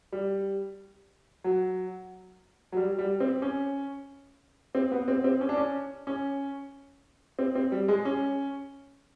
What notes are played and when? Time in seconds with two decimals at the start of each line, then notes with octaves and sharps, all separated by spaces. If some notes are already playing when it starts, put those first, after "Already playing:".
0.12 G3
1.44 F#3
2.72 F#3
2.77 G3
2.99 G3
3.20 C4
3.42 C#4
4.75 C4
4.91 B3
5.08 C4
5.24 C4
5.41 C#4
5.49 D4
5.57 C#4
6.07 C#4
7.39 C4
7.55 C4
7.72 G3
7.88 G#3
8.05 C#4